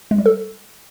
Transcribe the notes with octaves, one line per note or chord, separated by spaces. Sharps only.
G#3
G3
A4